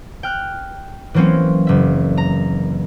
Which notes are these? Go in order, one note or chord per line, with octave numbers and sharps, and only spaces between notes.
G5 F6 F#6
E3 F#3 A#3 C4 C#4
F#1 E5
A#5